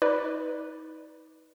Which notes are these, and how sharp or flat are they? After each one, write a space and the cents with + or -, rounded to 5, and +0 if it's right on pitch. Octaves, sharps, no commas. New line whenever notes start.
D#4 +35 B4 +0 D5 +0